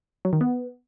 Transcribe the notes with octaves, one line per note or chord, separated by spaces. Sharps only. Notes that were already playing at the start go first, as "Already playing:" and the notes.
F#3
D#3
B3